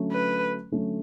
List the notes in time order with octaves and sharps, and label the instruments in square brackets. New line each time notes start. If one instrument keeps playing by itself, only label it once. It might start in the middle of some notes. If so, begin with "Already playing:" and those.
Already playing: [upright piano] D3 F#3 A3 C#4
[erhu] B4
[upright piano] D3 F#3 A3 C#4